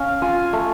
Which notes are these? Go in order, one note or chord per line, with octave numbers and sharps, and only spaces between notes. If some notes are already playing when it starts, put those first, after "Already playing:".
Already playing: C#4 F5
F4 G#5
A3